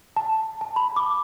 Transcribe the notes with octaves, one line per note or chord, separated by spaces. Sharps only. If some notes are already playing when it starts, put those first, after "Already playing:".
A5
A5
B5
D6